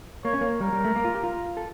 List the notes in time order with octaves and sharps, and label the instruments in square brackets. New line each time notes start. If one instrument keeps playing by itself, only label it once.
[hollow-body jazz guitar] A#3 [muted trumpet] C#5
[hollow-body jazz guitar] C#4
A#3
[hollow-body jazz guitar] G3 [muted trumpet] A#4
[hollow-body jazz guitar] G3
A3
A#3
F4
G4
F4
A4